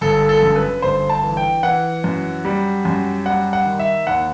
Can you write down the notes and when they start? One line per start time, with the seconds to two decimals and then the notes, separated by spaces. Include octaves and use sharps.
0.01 G1 A4
0.29 A4
0.43 F#2
0.56 B4
0.82 G1 C5
1.09 A5
1.23 E3
1.37 G5
1.63 E3 F#5
2.04 F#2
2.45 G3
2.85 F#2
3.25 G3 F#5
3.53 F#5
3.66 D#3
3.79 E5
4.07 D#2 F#5